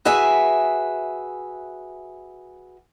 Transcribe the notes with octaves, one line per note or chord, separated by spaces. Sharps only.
F#4 G#4 B4 E5 G#5